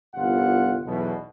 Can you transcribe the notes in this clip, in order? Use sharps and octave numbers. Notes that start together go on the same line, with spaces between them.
G1 C2 F4 F#5
B1 E2 B2